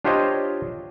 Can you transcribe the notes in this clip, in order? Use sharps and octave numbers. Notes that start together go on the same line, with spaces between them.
D4 F4 G4 C5 C#5 D#5